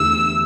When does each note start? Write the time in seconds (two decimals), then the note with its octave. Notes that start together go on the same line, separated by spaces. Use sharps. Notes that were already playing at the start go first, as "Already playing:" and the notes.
Already playing: E2 D3 A3 E4 G4 E6